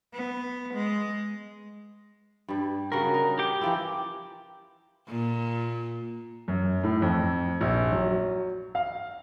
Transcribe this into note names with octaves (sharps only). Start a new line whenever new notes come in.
B3
G#3
G2 G3
C#3 G3 F#4 A#4
D#4
G4 G5
E3 F3 E4
A#2
F#2
A2
F2
A#1
F#3
F5